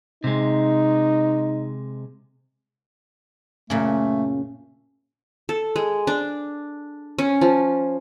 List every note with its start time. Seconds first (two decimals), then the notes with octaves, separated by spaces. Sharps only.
0.24 C3 G#3 D#4
3.70 F#2 A#2 C#3 A3
5.49 A4
5.76 G#3
6.07 D4
7.18 C#4
7.41 F3